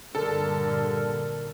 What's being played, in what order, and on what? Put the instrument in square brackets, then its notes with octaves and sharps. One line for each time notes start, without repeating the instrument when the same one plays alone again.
[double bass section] G2 A#2 D3 [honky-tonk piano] A4 [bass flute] A#4